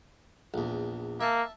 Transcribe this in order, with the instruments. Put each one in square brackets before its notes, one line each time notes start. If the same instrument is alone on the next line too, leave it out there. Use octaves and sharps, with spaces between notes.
[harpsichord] A#1 E2
[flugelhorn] A#3 [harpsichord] E5 A5